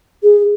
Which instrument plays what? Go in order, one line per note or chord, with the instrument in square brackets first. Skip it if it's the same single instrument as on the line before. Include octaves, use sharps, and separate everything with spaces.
[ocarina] G#4